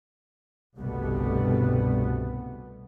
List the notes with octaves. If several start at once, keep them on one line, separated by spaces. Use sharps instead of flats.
G1 C2 B2 G3 A3 B3